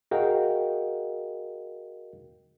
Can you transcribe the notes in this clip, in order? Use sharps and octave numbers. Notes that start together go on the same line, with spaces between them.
F#4 G#4 A#4 D#5 F5 G5